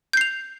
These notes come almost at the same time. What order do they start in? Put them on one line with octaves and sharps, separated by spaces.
G6 C7 F7